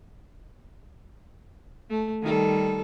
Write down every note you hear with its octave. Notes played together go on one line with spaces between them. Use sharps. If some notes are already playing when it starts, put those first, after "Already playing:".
A3
D#3 G3 A4